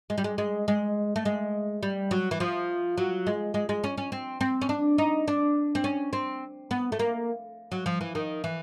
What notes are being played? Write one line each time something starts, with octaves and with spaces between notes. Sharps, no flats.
G#3
G3
G#3
G#3
G#3
A3
G#3
G3
F#3
E3
F3
F#3
G#3
G#3
G#3
C#4
C#4
C4
C4
C#4
D4
D#4
D4
C4
C#4
C4
B3
A3
A#3
F#3
F3
E3
D#3
E3